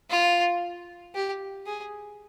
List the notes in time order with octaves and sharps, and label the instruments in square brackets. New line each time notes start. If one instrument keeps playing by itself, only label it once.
[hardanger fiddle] F4
G4
G#4